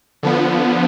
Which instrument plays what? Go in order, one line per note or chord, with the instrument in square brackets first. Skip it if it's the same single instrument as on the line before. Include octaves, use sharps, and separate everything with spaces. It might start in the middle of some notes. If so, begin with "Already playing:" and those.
[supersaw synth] D3 F3 B3